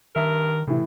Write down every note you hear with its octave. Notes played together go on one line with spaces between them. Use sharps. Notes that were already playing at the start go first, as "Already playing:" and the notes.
G2 D#3 A#4 E5
A2 C3 E3